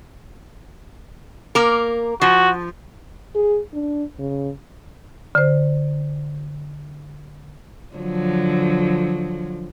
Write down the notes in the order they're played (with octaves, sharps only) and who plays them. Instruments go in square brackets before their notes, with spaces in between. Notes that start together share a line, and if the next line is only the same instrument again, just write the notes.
[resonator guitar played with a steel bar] A#3 A#4
[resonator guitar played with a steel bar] F3 [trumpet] F#4
[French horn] G#4
D4
C#3
[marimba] D3 C5
[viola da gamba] D3 F3 F#3